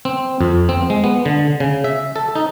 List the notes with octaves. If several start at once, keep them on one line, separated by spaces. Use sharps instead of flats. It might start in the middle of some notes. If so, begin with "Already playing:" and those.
C4
F2
C4
G#3
B3
D3
C#3
E5
A4
D#4